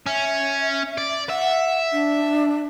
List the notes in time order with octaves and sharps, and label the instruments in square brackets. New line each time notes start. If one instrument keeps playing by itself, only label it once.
[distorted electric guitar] C#4 [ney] E5
[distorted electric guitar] D5
[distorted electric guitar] E5 [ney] F#5
[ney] D4